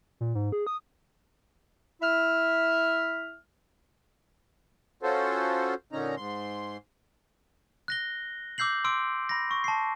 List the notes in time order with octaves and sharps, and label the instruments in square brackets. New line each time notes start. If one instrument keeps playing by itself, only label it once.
[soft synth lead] A#2
G#2
G#4
D#6
[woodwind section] E4 E5 F6
[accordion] C#4 F4 F#4 A4 C5
A#2 D3 C#4 D#4 A#5
G#2 C6
[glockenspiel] F#6 A#6 G7
D6 E6 G6 C7 F#7
C6 D6 E6 D7
B5 A#6
C#6
A5 C7